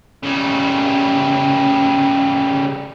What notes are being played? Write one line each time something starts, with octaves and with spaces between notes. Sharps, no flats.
C#3 G3